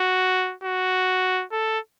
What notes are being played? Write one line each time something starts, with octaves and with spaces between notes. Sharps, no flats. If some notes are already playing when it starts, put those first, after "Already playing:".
Already playing: F#4
F#4
A4